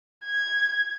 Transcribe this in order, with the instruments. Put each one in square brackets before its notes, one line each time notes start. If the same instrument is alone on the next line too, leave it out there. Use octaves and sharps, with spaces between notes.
[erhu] G#6